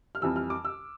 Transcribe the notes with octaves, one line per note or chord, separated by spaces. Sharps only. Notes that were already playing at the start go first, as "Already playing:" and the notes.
F6
F2 E3 G3 E6
F6
D6
E6